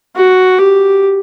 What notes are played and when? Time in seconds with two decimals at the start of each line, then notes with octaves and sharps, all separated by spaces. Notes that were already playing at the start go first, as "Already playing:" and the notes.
0.16 F#4
0.59 G4